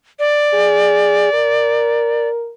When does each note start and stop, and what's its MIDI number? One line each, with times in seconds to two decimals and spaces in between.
0.19 2.28 74
0.53 1.31 68
1.33 2.52 70